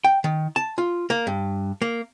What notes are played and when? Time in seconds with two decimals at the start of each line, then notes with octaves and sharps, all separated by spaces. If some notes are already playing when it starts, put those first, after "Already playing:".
0.05 G5
0.24 D#3
0.56 A5
0.78 F4
1.10 A#3
1.27 G2
1.82 A#3